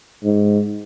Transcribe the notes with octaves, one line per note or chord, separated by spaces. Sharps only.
G#2